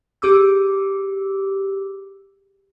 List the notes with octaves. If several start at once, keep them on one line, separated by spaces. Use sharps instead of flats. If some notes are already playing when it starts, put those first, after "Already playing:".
G4 G#4 D6 E6